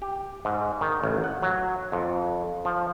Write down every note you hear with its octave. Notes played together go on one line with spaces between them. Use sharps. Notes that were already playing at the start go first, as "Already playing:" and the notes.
G4
G#2
D#3
A1
F#5
F#3
F2
F3